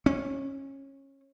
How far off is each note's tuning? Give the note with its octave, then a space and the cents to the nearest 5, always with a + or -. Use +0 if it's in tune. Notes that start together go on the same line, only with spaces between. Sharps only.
C#4 -20